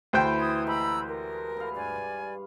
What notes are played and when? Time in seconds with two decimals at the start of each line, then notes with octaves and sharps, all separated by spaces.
0.13 D2 E3 C5 G5
0.40 D#6 G#6
0.67 G#3 G4 A#5 B5 E6
1.06 A#4
1.57 B4 F5
1.76 G2 D5 G#5